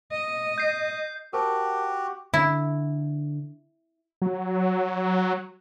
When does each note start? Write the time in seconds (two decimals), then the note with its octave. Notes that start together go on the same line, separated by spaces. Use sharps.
0.11 D#5
0.58 G6 C7
1.33 F#4 G4 A#4 C5 A5
2.34 D3 E4
4.22 F#3